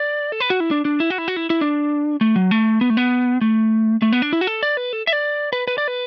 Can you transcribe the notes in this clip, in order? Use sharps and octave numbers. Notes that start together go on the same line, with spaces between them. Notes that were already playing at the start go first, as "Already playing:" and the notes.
Already playing: D5
A4
B4
F#4
E4
D4
D4
E4
F#4
E4
F#4
E4
E4
D4
A3
F#3
A3
B3
A3
B3
A3
A3
B3
D4
E4
F#4
A4
D5
B4
A4
E5
D5
B4
B4
D5
B4